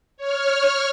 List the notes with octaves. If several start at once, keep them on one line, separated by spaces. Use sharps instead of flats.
C#5 F6